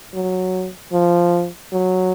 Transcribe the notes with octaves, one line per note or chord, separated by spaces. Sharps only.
F#3
F3
F#3